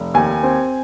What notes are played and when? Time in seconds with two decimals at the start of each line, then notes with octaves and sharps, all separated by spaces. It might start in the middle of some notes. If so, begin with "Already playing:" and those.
Already playing: F1
0.14 D#2 G#5
0.43 C4